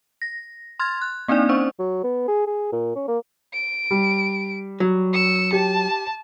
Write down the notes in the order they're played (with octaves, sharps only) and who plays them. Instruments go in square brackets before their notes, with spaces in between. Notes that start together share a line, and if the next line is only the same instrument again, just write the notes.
[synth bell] A#6
C6 F6 G#6 A6
F#6
A#3 C4 D4 D#4 D5
C#4 C5 C#6
[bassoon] F#3
B3
G#4
G#4
A#2
C#4
A#3
[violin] D7
[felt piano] G3
[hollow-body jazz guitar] F#3
[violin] E6 C#7
[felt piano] G4 [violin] A5